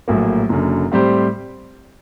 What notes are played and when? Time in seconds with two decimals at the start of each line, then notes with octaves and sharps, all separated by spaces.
0.08 A#1 A2 F#3 A#3
0.49 F#1 F#2 D3
0.92 A2 G3 C4 G4 C5